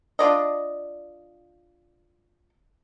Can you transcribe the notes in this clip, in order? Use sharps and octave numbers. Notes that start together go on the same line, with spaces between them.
D4 F4 D5 D#5